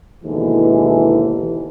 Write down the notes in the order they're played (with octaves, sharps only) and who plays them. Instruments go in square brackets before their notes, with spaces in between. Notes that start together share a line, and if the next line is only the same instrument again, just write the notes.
[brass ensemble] D#2 G#2 B2 D3 E3